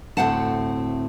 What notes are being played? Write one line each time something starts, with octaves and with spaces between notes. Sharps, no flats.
D2 A2 C3 C4 F#5 A5